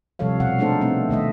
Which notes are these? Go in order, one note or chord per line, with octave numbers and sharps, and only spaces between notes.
C3 F3 G3 A4 C#5 F5
B2 F5 F#5
G#3 A3 D4 D#4 A4 C5
A3 B3 C4 D4
D#3 A3 D#5 E5